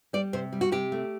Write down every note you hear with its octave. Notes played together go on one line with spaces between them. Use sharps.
G3 D5
C3 C5
G3
F#4
C3 G4
A3